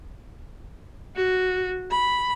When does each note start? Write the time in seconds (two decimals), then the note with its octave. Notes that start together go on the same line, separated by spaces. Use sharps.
1.16 F#4
1.91 B5